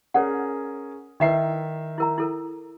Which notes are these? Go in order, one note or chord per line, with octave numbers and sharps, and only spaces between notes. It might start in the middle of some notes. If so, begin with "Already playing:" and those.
C#4 G#4 A#4 C#5 D5 F#5
D#3 D#4 E4 B4 E5 C7
E4 A#4 A#5
E4 A4 A#4